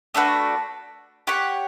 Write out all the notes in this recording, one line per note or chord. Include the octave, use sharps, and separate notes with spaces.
A3 D4 F#4 B4
G4 C#5 F#5